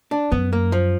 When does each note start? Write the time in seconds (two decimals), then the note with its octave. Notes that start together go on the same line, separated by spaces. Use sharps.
0.11 D4
0.32 F#2 B3
0.53 A#3
0.72 F3